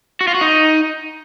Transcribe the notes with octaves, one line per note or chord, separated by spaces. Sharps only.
F#4
F4
F#4
D#4